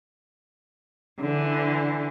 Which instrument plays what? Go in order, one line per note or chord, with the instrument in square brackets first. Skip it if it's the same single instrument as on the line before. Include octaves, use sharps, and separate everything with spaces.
[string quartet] D3 E3